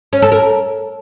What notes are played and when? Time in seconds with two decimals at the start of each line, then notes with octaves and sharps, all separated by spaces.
0.13 C#4
0.22 A4
0.32 A#4